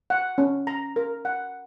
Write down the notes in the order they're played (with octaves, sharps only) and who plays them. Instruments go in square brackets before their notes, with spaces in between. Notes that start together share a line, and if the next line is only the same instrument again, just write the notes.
[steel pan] F#5
C#4
A#5
A#4
F#5